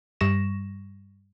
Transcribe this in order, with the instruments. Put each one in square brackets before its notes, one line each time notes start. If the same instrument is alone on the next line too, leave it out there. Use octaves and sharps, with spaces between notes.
[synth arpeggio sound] G2 G3 C#6 A#6 E7